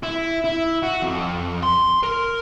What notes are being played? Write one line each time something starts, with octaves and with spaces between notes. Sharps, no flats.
E4
E4
F#4
F2
C6
A#4